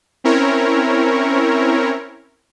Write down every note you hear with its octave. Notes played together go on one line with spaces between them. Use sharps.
C4 C#4 E4 A#4 C#5